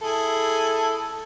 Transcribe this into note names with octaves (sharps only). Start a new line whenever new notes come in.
E4 G#4 A4